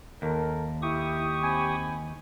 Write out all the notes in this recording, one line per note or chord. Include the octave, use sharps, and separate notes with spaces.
D#2 A4 A#4
E4 G4 C#6 D#6
C4 G#5 B5